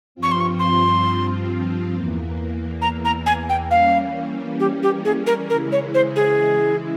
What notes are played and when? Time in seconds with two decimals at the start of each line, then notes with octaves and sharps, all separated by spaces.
0.15 G2 F3 C4 F4
0.23 C#6
0.32 C6
0.40 C#6
0.59 C6
1.93 E2 E3 A#3
2.82 A#5
3.05 A#5
3.26 G#5
3.49 G5
3.71 E3 G3 A#3 C#4 F5
4.60 G4
4.83 G4
5.05 G#4
5.27 A#4
5.50 C#3 E3 G#3 E4 A#4
5.72 C#5
5.94 C5
6.16 G#4